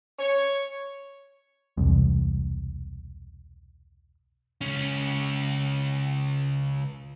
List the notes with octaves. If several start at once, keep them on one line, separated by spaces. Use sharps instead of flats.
C#5
E1 C2
C#2 C#4